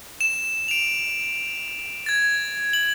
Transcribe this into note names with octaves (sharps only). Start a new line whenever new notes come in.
E7
D7 F7
G#6 A6
F#7